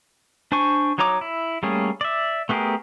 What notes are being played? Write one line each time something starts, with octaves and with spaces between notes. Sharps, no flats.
D4 C5 G#5 C#6
F#3 D#4 C#5 A#5 D6
E4
G3 A3 A#3 C#4 G#4
D5 E5
A3 B3 G4 G#4 A#4